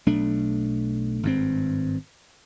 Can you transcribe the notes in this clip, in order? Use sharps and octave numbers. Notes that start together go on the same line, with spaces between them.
B1 A3 D4
G#1 G2 C4